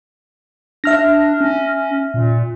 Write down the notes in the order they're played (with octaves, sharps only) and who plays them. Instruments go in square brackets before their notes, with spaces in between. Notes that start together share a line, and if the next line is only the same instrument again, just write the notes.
[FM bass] D4 [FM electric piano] E5 F6 A#6
[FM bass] C#4
A#2